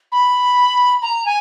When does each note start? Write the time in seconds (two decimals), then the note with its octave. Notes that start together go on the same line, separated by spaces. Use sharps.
0.12 B5
1.02 A#5
1.25 G#5